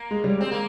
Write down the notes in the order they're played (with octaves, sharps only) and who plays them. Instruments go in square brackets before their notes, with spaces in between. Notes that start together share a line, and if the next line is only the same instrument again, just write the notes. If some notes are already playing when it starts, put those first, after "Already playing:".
Already playing: [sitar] A#3
[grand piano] G#3
G3
[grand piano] G#3 [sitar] C4
[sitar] A#3